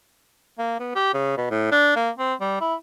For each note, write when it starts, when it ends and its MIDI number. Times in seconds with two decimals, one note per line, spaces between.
0.58 0.75 58
0.80 0.92 59
0.95 1.13 67
1.13 1.35 49
1.37 1.47 47
1.50 1.67 45
1.72 1.92 62
1.96 2.10 58
2.18 2.34 60
2.41 2.58 55
2.61 2.75 64